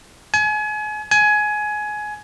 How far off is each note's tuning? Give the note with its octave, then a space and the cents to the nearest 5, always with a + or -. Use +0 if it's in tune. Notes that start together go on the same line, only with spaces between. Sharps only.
G#5 +35
G#5 +20